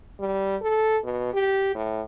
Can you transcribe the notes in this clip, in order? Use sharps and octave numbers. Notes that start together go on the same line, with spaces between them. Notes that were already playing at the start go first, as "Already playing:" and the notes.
G3
A4
B2
G4
A2